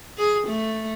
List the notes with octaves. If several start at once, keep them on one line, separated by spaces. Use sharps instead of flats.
G#4
A3